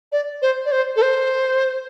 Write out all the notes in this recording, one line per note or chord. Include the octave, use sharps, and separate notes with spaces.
D5
C5
D5
C5
A4
C5